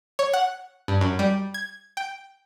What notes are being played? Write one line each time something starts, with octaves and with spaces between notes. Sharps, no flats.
C#5
F#5
G2
F#2
G3
G#6
G5